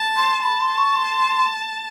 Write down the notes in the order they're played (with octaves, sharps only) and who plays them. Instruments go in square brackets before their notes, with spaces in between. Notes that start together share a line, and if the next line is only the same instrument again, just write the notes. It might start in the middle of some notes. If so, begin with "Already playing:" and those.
Already playing: [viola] A5
[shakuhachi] C6
[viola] A5 [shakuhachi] B5
[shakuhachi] C6
C#6
C6